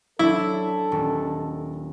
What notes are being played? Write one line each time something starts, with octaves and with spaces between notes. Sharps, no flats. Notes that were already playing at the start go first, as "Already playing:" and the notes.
F#3 D4 E4 A4
D#1